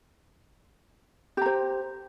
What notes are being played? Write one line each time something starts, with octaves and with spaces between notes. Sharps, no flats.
G4 C5 A#5